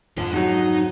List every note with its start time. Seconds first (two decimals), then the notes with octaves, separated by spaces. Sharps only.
0.17 F2 G#2 D3 F4 G5
0.34 F#3 D#4 F#4